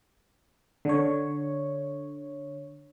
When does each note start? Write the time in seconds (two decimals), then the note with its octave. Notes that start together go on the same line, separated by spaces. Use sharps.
0.85 D3 C#5